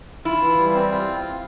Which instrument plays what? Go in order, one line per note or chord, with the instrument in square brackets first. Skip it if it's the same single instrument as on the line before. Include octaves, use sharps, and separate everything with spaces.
[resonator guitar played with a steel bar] E4 [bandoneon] F4
[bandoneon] E3
G3
C4
F4